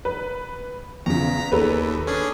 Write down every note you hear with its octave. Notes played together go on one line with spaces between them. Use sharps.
B4
E2 C#3 A#5 B6
D#2 A4 B4
C#4 D4 G#4